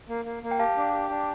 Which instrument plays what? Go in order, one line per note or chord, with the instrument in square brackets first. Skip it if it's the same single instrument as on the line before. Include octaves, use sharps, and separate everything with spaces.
[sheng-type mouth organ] A#3
A#3
A#3
[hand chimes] G5
[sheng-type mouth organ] G4 [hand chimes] F5 A5
[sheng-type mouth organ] D4
G4
D4